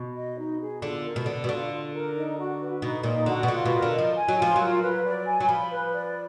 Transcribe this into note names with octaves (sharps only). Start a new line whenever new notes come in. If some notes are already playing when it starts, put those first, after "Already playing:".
Already playing: B2
D#5
D#4
G#4
D3 F4
A#4
B2
D3 D5
B2
D3 F4
F4
A#4
D#4
F#4
B4
B2 D#4
A#2 D#4
D3 F#4
B2
D3 F4
B2 A#4
D3
D#5
F3
G#5
F#3
F3 F4
F#3 A#4
B4
D5
G#5
F#3
F3 B5
B4
D5